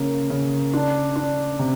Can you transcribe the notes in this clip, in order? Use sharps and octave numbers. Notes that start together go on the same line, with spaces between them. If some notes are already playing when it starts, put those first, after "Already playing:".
Already playing: C#3 A#3
C#3
D4
D4
C3